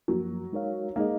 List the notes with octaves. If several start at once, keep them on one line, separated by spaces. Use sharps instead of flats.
F#2 F3 F#3 A#3
G#3 D#4 A#4 C#5 F5
G#3 A#3 D#4 G#4 D#5